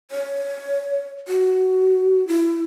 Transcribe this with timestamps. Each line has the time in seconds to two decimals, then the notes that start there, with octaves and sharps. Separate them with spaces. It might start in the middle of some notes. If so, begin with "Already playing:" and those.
0.11 C#5
1.28 F#4
2.28 E4